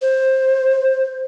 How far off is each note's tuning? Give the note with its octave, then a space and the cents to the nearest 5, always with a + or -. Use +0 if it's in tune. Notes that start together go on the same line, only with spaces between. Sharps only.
C5 +15